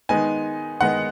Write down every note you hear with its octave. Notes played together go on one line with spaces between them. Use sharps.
D#3 G#3 B3 D#4 G#5
D#3 G#3 B3 D#4 F#5